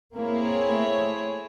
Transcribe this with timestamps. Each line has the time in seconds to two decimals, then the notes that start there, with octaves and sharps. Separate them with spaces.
0.15 A#3 C4 E4 G#4 C#5
0.67 A3